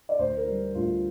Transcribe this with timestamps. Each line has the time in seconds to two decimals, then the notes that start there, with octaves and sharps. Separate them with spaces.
0.09 D5
0.19 D2 C5
0.37 A#4
0.47 G3
0.75 D2 F4